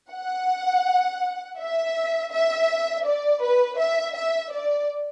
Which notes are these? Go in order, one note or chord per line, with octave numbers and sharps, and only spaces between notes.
F#5
E5
E5
D5
B4
E5
E5
D5